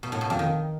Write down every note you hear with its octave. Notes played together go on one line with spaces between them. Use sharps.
B2
A2
B2
F2
D#3